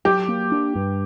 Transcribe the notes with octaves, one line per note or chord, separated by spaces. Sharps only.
F#3 G4
A#3
D4
G2